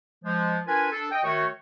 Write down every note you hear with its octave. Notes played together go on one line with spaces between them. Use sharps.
F3 G#3
D4 F4 A#4 B4 G#5
D4 A4
D#5 G5
D#3 A3 F#4 C#5